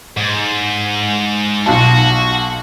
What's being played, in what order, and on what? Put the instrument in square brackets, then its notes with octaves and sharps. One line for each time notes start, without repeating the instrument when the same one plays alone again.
[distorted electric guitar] G#2
[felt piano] B1 F4 A5 [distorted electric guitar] F#4